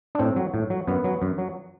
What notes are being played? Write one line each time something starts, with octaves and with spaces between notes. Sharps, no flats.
D4
A2 C4
F#3
A2
F#3
F#2 B3
F#3
F#2
F#3